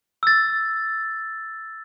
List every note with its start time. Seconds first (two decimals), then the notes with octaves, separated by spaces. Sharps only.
0.23 E6 A6